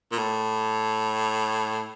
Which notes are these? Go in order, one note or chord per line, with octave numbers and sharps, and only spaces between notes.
A#2
A2